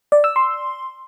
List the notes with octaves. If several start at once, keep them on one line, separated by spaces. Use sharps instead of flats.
D5
E6
C6